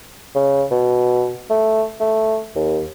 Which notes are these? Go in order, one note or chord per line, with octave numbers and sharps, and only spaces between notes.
C#3
B2
A3
A3
D#2